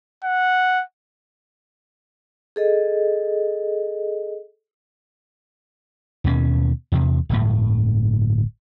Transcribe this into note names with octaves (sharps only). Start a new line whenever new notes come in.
F#5
G#4 A4 D#5
D#2 B2 B3 C#4
E2 C3
D1 G1 A2